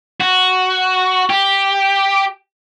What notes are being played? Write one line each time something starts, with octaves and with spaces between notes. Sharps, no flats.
F#4
G4